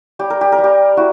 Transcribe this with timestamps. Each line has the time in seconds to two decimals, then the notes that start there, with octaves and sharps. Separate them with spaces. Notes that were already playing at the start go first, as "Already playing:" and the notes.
0.19 G3 G4
0.30 A#4
0.41 G4
0.52 A#4
0.58 G3
0.64 G4
0.97 E4 F#4